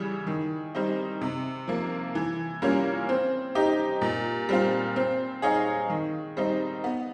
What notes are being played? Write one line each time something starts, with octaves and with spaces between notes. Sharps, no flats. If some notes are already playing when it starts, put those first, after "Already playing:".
Already playing: C#3 E3 G3
D#3
G3 C4 D#4
C3
F3 A#3
E3
G3 A#3 C#4 F4
C4
D#4 G4
A#2
G3 C4 F4
C4
D#4 G#4 C#5 F5
D#3
G3 C4 D#4
B3